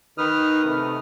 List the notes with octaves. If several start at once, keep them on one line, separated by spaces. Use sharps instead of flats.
D#3 D#4 B4 D#6 F6
C3 A3